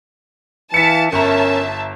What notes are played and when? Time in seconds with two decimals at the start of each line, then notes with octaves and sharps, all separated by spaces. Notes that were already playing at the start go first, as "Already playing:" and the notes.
0.74 E3 F5 A5 B6 C#7
1.12 G1 C#4 A#4 E5 A5 A#5